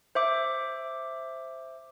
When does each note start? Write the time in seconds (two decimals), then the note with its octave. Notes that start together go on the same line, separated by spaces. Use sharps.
0.15 C5 E5 D6